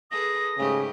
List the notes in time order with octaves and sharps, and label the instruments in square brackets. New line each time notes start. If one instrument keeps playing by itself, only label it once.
[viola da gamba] G#4 A4 B4 [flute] D#6 [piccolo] A#6
[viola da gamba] G#2 A3 G4 [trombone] C#3